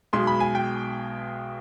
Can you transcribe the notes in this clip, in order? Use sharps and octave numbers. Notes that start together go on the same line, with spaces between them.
B1 B2 G#3 C6
B5
G#5
G5